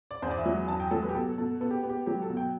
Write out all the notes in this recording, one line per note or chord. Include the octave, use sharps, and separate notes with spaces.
D5
E2 C5
D5
E5
F#3
E2 A5
G5
F#3 A4
B4
G4
B2 A4
B2 A4
B3 A4
G4
B3
G4
F#3 G4
A4
B2
G5